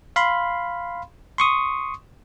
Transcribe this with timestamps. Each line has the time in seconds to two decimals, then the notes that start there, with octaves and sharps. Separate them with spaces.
0.16 F5 B5 C6
1.38 C6 C#6 D#6